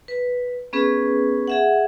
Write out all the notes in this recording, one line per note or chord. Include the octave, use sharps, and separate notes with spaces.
B4
B3 C#4 G#4 B4
G#4 E5 F#5